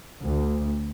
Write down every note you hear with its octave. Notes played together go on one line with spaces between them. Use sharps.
D2